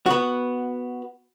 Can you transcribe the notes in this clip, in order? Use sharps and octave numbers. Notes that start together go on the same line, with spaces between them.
B3 F#4